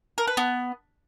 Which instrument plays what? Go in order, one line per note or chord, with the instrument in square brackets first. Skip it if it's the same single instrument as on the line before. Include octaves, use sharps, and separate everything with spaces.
[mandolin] A#4
B4
B3